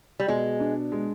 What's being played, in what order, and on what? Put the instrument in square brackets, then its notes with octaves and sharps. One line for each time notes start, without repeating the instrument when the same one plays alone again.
[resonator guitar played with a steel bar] G3
[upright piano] B2 [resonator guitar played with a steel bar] G#3
[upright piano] D4
G#3